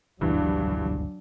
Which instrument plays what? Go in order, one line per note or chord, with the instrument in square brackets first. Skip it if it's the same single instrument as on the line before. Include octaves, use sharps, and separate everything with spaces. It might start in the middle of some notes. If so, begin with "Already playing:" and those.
[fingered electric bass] G#1 D2 [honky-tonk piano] G2 E3 [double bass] F#3 D4